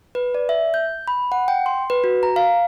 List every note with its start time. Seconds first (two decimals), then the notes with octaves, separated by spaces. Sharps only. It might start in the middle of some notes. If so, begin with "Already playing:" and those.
0.15 B4
0.35 D5
0.49 E5
0.74 G6
1.08 B5
1.32 F#5
1.48 G5
1.66 C6
1.90 B4
2.04 F#4
2.23 A#5
2.36 F5